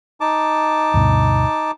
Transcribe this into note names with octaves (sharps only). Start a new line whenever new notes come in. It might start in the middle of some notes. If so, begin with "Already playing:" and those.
D#4 A5 D6
D2 G2 B2